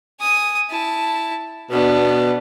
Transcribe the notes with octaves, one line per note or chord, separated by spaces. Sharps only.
G#5 D#6
E4 A5
B2 B3 D4